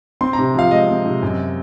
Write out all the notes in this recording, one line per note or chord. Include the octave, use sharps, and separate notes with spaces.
C4 C6
C3 A#5
F3 F5
G#3 D#5
C4
C3
F#2